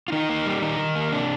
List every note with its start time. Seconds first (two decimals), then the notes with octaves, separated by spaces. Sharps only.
0.08 F4
0.12 D#3 D#4
0.29 A#3
0.46 G3
0.62 D#3 D#4
0.79 D#3
0.95 A#3
1.12 C3 D4